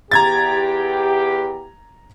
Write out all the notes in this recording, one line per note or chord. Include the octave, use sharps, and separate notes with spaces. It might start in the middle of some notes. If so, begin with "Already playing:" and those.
E2 G4 A#5 G#6 A6